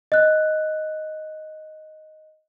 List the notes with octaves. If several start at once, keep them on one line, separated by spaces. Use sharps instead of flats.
D#5 F#6